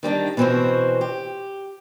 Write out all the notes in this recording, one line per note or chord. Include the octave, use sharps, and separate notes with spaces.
D#3 G3 D4 D#4
B2 E3 C4 C#4 F#4 C5
G4